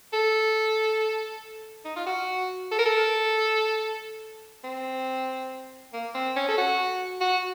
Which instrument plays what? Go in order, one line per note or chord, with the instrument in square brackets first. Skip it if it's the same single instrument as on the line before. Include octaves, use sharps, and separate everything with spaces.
[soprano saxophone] A4
D#4
F4
F#4
A4
A#4
A4
C4
A#3
C4
C#4
A4
F#4
F#4